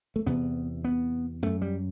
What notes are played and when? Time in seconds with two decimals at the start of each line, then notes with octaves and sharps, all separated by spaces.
0.16 A3
0.26 E2 C3 B3
0.84 B3
1.42 F#2 A3
1.62 G3